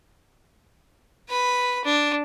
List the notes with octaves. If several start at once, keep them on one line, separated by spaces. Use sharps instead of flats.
B4 B5
D4